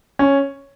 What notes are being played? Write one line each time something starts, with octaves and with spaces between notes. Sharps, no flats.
C#4